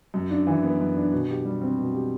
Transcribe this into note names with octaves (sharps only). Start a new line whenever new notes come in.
F#2
D4
E3
B3
F#2
D4
B2
G4
G3
C4
B2
G4